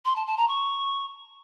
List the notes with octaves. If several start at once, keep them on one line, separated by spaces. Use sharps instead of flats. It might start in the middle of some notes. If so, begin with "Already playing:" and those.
C6
A5
A5
A#5
C#6